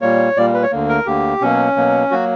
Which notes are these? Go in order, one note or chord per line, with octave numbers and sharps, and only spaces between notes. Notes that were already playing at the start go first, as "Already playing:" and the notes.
A#2 G3 A#3 C#5
A#2 G3 A#3 D5
B4
C#5
D2 D3 A#3
A#4
D2 D3 A#3 G4
B2 F#3 A#3 C#4
B2 F#3 A#3
F#3 A#3 F#4